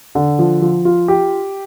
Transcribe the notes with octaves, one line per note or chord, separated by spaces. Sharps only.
D3
F3
F3
F4
G4